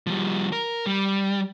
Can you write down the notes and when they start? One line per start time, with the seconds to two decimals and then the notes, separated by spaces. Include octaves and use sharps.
0.07 F3 G3
0.52 A#4
0.86 G3